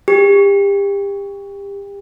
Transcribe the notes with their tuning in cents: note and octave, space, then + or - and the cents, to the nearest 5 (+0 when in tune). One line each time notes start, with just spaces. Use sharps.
G4 +30